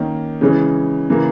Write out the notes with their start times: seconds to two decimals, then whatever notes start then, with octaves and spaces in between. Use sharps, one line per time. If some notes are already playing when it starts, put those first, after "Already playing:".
Already playing: D#3 A#3 C#4
0.41 C#3 E3 G#3 C#4
1.10 C#3 E3 A#3